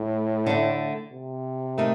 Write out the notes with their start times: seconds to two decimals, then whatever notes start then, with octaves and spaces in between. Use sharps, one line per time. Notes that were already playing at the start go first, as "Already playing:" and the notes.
Already playing: A2
0.47 D3 A3 D4
1.13 C3
1.78 D#3 A3 D#4